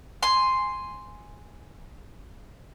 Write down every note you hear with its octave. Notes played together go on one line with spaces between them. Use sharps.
G#5 C6